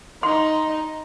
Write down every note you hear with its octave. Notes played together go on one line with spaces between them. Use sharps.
D#4 C6